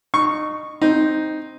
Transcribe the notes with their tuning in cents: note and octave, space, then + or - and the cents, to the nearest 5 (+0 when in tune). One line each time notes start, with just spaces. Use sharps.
D#4 -25 C#6 +0
C4 +0 D#4 +0